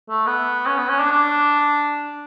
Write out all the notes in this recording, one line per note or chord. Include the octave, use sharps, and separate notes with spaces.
A3
B3
C#4
B3
C#4
D4
D4